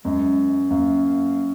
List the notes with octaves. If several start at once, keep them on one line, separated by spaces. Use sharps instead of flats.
F#2 G#3
F#2 A#3